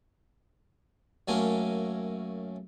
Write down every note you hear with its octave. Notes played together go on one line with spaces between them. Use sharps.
F#2 A3 A#3 C#4 G#5 A#5